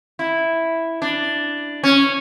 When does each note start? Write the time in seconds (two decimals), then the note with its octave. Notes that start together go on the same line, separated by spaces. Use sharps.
0.19 E4
1.02 D4
1.83 C#4